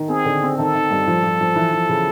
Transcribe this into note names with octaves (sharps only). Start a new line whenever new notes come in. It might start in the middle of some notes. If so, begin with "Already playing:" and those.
Already playing: D#3
C4 G#4
D3
C4
D#3 A4
D#3
G2
F3
F3
F3
E3
E3
C#3